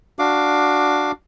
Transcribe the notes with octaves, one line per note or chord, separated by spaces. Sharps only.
D4 F#4 F5 D6